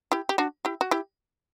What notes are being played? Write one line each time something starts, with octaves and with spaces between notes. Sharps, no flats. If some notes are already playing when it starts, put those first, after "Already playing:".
E4 G4
G4
D4 F#4
E4 G4
F#4
E4 G4